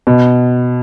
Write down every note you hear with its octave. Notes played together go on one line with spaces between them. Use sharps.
B2